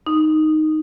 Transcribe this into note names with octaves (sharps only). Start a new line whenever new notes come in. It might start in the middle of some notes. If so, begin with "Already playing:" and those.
D#4